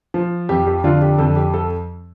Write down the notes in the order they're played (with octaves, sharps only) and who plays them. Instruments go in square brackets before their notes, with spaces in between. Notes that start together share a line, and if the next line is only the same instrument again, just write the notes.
[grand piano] F3
F2 G4
G4
D3 F4
G4
F2 A4
G4
A4